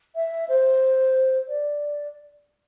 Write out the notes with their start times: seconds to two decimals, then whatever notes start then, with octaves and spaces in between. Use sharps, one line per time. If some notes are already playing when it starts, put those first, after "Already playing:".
0.15 E5
0.49 C5
1.48 D5